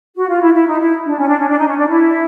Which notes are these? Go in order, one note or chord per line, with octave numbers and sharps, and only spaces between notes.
F#4
F4
E4
E4
D#4
E4
D4
C#4
D4
C#4
D4
D#4
C#4
D4
E4